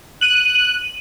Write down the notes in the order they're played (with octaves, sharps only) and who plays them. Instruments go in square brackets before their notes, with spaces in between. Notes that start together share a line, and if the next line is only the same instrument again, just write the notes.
[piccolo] F#6 [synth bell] D#7 F#7